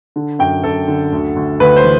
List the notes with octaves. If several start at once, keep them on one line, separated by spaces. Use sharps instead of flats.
D3
F#2 G5
F#2 A4
D3
D2
D2
D2 B4
C5
E3